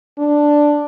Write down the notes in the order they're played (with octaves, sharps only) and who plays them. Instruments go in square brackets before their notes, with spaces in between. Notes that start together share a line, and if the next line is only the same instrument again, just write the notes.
[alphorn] D4